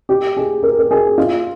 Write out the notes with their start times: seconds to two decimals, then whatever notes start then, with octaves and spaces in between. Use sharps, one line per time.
0.09 G4
0.37 G#4
0.63 A#4
0.79 A#4
0.91 G#4
1.18 F4